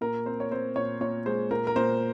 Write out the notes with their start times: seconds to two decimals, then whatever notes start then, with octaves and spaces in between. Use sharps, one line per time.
0.01 A#2 A#4
0.26 C4 C5
0.40 C#5
0.51 C4 C5
0.76 A#2 C#5
1.01 A#2 C#5
1.26 G#3 C5
1.51 A#2 A#4
1.67 A#4
1.76 A#2 C5